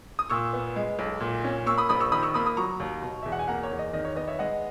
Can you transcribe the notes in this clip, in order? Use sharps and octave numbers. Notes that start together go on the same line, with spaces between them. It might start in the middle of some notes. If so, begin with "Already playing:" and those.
D#6
A#2 C#6 E6
B3
G#3
B1
A#2
C#4
A#3 C#6 E6
B5 D#6
A#1 B5 D#6
C#6 E6
D#3 B5 D#6
C#6 E6
A#3 B5 D#6
B5 D#6
F#3 A#5 C#6
D#2
B2
E2 E5
F#5
G#5
A#3 F#5 A#5
C#5
E2
D#5
D#3 D#5
C#5
B3 D#5
C#5 E5
G#3 D#5 F#5